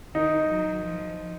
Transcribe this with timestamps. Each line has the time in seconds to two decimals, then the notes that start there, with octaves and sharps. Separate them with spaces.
0.14 D#3 D#4
0.49 F#3
0.83 F3